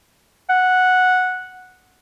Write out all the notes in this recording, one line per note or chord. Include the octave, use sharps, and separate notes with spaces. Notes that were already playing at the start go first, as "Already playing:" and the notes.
F#5